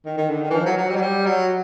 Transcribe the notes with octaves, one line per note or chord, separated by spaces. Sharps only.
D#3
D#3
D3
D#3
E3
F3
F#3
F#3
G3
F#3
G3
F#3